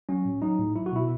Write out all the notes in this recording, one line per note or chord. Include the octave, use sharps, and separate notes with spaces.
F#3 C#4
A2
F#3 D#4
A2
F#3 E4
F#4
B2 E4